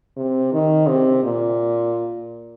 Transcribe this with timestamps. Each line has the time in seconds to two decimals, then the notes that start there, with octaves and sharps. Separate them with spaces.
0.17 C3
0.53 D#3
0.88 C3
1.24 A#2